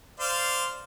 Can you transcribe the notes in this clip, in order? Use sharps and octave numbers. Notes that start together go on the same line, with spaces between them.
C5 D5 F5